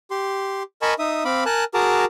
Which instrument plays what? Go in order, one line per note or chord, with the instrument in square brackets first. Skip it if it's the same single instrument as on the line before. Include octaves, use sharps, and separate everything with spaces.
[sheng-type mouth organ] G4 C6
A#4 D#5 G#5 A5 B5 C#6
D#4 E5 D#6
C4 F5 B5 D6
A#4 G#5 A5 F#6
F#4 G#4 A#4 A5 A#5 D6